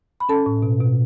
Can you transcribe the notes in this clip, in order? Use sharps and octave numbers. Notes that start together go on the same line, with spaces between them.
B5
C#4 A4 A5
A2
B2
B2